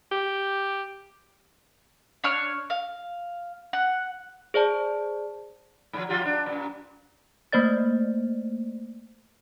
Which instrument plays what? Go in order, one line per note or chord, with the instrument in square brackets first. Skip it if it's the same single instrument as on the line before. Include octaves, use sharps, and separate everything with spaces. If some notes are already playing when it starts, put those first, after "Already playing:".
[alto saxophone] G4
[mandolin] D4 C#5 F6
F5
F#5
[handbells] G#4 C5 D5 A5
[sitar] G#2 F3
F3 F4 G4
D4
F#2 A#2
[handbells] A3 A#3 C5 D5 A6